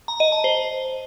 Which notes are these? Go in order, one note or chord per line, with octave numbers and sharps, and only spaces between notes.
A#5
D#5
A5
C5